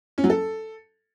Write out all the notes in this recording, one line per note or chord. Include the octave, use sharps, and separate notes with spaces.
C#4
F#3
A4